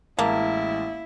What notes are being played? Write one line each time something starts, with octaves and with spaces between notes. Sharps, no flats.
A1 G#3 A#3 E4 A5